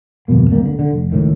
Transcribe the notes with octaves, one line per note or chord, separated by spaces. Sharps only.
G1 F2 B2 A#3
D1 C#2 G3 A#3
D3
D3
F1
C#2 A2 D#3